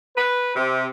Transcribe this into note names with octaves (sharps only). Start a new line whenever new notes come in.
B4
C3